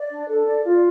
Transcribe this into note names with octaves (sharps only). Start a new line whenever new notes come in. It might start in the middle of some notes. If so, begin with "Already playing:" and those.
Already playing: D5
D4
A4
D5
F4